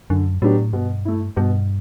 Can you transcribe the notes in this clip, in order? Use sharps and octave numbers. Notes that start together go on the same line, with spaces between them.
F#2 D3
A2 F#3 B3 D4 G4
G2 B2
A3 E4
G2 B2